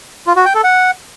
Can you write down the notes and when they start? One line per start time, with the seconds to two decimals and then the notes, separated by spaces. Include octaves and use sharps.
0.27 F4
0.36 F#4
0.45 G5
0.55 A4
0.64 F#5